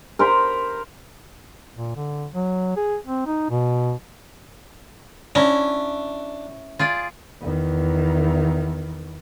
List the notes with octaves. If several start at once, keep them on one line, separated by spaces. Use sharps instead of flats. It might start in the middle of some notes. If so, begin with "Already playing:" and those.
A#4 C5 B5
A#2
D3
F#3
G#4
C4
D#4
B2
C#4 D4 E4 A#5
F4 G#4 D5
E2 D#3